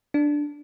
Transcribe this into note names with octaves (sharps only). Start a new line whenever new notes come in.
D4